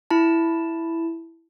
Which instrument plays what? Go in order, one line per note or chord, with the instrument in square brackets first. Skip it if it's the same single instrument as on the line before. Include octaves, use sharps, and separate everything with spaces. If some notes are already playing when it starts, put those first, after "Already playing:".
[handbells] E4 A5